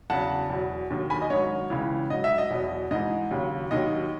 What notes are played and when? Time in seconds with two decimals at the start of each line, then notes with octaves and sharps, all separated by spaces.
0.10 E2 C#3 F#3 F#5 A5
0.50 E2 B2 F#3
0.90 D#2 D#3 F#3
1.10 G#5 B5
1.22 D#5
1.30 G#2 D#3 F#3 C#5
1.70 C#2 C#3 E3
2.10 G#2 F#3 D#5
2.24 E5
2.38 D#5
2.50 E2 B2 F#3
2.91 G#2 E3 D#5
3.31 D#2 C#3 F#3
3.71 D#2 D#3 F#3 D#5